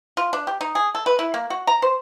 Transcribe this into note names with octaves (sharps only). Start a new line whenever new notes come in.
F4
D4
G4
D#4
G#4
A4
B4
E4
A#3
F#4
A#5
C5